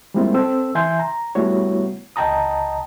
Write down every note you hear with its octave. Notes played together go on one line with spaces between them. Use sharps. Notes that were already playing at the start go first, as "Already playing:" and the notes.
G3 G#3 A#3 C4 E4 F4
C4 A4 E6
E3 E5 G#5 C6 G6
A#5
G3 A3 B3 E4 F#4 C#5
C#2 D#5 G5 A5 A#5 D#6